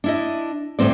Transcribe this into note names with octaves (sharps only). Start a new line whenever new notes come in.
D4 E4 D#5
D2 A2 D#3 C4 D5